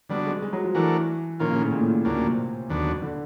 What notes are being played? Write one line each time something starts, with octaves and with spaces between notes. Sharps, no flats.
D3 F#3 G3 B3 D4
G#3
G#3
F#3
F3
E3 A3 D4 F#4 A#4
A#2 D#3 F3 A#3 C#4 F4
C#3
A2
A#2
A2
A#2
D2 A2 C#3 F#3 A#3 D4
A#2
C3
D#2 D3 F#3 B3 D4
D3